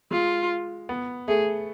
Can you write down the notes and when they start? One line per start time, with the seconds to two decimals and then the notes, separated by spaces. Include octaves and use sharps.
0.11 G#3 F4
0.89 B3
1.28 A3 G#4